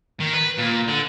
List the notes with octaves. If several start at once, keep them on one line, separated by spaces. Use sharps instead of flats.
D#3
B4
A#2
D3